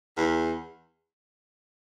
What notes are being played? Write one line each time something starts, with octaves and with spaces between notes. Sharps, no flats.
E2